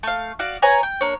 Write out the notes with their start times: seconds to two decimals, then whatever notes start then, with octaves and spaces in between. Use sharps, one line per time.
0.03 A3 F5
0.39 F#4 D5 F5
0.62 B4 C#5 G#5 A#5
0.83 G5
1.01 A#3 D4 C#5